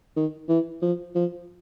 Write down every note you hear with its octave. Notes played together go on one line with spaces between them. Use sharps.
D#3
E3
F3
F3